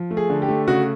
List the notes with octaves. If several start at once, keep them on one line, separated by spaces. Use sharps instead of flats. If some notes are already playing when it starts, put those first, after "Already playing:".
Already playing: F3
A3
G#4
D3
G4
A3
C#3 F#4